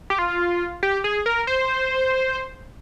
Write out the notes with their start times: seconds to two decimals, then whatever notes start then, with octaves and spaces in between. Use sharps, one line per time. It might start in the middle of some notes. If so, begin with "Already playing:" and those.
0.10 G4
0.19 F4
0.83 G4
1.04 G#4
1.26 A#4
1.47 C5